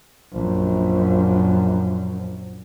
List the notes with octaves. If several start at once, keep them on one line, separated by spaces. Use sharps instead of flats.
A#1 F#2